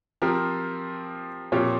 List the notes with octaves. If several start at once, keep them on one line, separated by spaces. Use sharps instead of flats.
F3 C4 G4 A#4
A#2 F3 C4 G4 C#5